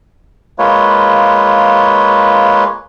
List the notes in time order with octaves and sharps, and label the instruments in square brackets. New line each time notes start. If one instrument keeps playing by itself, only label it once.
[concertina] G#3 A#3 F4 B4 C#5